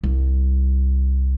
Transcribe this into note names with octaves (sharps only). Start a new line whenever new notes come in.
C2